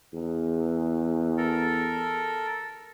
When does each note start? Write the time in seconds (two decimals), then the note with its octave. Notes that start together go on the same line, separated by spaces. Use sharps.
0.14 E2
1.37 A4 A#4